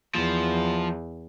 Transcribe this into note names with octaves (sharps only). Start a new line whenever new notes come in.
E2 F3